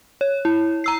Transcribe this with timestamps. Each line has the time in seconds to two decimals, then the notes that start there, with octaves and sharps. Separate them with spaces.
0.21 C#5
0.45 E4
0.84 A#5 E6 C7